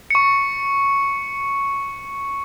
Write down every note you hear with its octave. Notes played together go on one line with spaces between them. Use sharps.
C#6 C#7